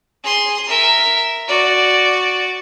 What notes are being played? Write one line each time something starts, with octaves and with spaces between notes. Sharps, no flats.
G#4 C6
A#4 E5
F#4 D5